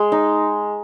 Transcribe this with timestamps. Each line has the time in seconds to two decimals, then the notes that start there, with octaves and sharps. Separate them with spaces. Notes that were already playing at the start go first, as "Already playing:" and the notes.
Already playing: G#3
0.12 D#4